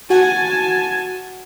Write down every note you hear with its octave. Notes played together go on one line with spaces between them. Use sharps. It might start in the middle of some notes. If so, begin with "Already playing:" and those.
F#4 F#5 G#5 A5